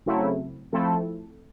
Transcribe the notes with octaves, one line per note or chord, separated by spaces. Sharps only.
C#3 F#3 A3 C4 E4
F3 A3 C4 E4 A4